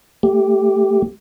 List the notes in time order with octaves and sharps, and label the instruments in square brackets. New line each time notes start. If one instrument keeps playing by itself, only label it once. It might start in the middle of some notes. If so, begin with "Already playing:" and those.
[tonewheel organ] A3 G4